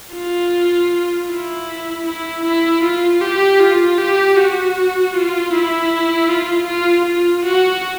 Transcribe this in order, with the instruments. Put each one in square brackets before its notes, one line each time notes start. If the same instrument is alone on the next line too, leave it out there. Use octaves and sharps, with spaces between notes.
[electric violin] F4
E4
E4
E4
F4
G4
F4
G4
F#4
F4
E4
F4
F4
F4
F#4